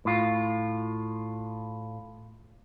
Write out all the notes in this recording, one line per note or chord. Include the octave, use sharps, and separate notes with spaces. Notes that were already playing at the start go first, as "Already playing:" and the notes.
A2 F4